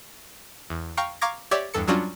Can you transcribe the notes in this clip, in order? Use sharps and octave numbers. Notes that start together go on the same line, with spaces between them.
E2
F5 G5 A#5 C#6
F5 A#5 C#6 D6 G#6 A#6
G4 C#5 D5 E5
E2 G2 A4 C#7
F#3 G3 C#4 D4 F4 F#4